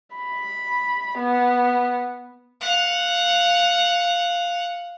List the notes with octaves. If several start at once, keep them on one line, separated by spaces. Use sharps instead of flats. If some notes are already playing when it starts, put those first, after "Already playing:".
B5
B3
F5 F#5